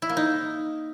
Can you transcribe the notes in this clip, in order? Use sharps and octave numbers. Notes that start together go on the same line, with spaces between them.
E4
A#3
D#4